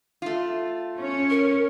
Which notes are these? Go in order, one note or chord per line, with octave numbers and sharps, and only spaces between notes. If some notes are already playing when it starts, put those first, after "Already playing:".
A3 F4
C#4 C#5
A#4